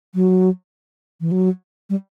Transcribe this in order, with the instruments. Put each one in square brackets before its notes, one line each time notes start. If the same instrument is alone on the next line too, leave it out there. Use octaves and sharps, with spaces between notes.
[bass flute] F#3
E3
F#3
G3